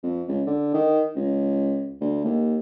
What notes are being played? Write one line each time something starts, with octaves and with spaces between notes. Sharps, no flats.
F2
C#2
D3
D#3
C#2
D2
D#2